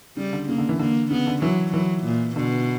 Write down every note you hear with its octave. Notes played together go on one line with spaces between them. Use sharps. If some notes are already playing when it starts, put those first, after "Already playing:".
C#3 G3
D3
C#3 A#3
D3
E3
D3 A#3
C#3 B3
D3
E3 F#3
E3 F#3
A#2
B2 D3